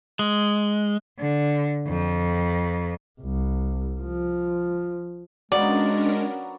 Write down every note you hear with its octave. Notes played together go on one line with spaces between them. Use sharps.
G#3
D3
F2
C2
F3
F#3 G#3 A#3 B3 C#4 D4 A#4 D5